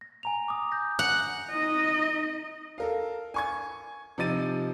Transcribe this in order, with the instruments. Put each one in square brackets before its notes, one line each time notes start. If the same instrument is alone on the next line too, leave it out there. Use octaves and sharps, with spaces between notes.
[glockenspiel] A#6
G#5 A#5 F7
D6 D#6
G6 A#6
[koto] F#5
[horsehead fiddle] D#4 D#5
[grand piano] A4 A#4 F5
G#5 C#6 G#6
C3 F3 D#4 A6 D#7